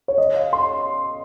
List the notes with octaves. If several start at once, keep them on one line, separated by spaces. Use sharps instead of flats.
C#5
D#5
F5
C6